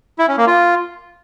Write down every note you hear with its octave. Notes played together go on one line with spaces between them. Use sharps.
E4
C#4
A#3
F4